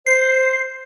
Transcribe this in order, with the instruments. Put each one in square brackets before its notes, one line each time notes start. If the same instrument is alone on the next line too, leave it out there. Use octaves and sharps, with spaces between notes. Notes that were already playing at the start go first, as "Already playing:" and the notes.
[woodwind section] C5 [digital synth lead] C7